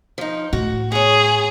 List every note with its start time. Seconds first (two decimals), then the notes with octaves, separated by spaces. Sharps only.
0.18 F3 D#4
0.53 A2 F#4
0.92 B3 G#4 C#5